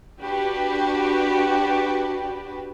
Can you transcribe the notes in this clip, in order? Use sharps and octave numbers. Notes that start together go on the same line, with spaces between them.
D4 F#4 G4 B4